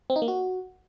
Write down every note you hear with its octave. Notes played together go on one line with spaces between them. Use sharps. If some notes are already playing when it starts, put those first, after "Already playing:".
C4
D#4
A#3
F#4